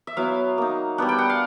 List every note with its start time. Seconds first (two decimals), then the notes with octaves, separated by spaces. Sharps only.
0.07 E5
0.17 F#3 B3 E4 F5
0.58 A#3 D#4
0.98 G3 B3 D4 F#5
1.09 G5
1.19 F#5
1.30 F5